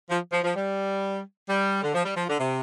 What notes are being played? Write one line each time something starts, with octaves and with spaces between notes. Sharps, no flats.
F3
F3
F3
G3
G3
D3
F3
G3
F3
D3
C3